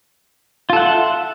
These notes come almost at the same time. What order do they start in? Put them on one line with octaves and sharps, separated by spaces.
F4 A4 F#5 E5